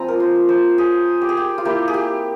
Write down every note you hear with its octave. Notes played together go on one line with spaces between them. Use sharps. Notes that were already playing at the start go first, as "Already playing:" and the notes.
Already playing: F3 C4 F4 G#5 A#5
A#4
C5
C5
G#4
G4
G#4
G4
F4
A#3 E4 G4
G#4
G4